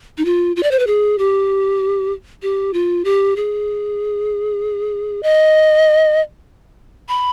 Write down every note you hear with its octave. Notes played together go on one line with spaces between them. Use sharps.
D#4
F4
F4
D5
C5
B4
G#4
G4
G4
F4
G4
G#4
D#5
B5